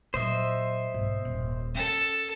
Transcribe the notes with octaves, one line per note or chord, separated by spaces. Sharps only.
A#2 F#3 C5 D#5 E5
B1 G#2
D#1
C#4 A4